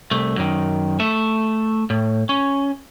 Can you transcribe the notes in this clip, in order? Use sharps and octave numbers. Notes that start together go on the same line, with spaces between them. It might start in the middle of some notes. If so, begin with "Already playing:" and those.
C2 A3
F#2 D#3
A3 E5
A2
C#4